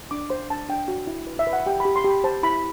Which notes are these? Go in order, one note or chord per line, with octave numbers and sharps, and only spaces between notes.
D4 D6
C5 C6
D4 A5
D4 G5
F#4
E4
B4
E5
B4
F#5
G4 G5
B5
G4
C6
G4
B5
C5 A5
E4 B5